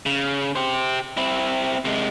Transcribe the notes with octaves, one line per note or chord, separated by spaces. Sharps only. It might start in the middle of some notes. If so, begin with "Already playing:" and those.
C#3
G4 C5
C4 E4
C3 G#3